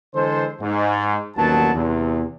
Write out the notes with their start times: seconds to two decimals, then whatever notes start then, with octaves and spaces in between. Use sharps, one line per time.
0.15 D3 E3 G#3 A4 C5
0.61 G#2
1.36 A1 D#2 A#2 F#3 B3 A5
1.74 E2 C3